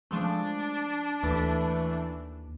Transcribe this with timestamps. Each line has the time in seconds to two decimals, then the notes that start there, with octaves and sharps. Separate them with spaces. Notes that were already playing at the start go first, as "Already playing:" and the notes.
0.11 F3 G#3 A3 D4
1.23 D#2 E3 A3 D6 A6 B6